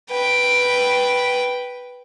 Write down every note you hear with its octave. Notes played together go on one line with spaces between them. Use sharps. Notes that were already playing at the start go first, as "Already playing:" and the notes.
B4 G5